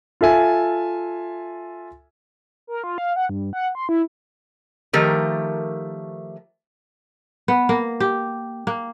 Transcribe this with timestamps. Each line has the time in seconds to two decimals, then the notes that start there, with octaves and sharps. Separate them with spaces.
0.21 F4 A4 E5 G#5
2.67 A#4
2.84 F4
2.98 F5
3.16 F#5
3.29 G2
3.53 F#5
3.75 C6
3.89 E4
4.93 D#3 F3 A3 G4 A#4
7.48 B3
7.69 A#3
8.00 G4
8.67 A#3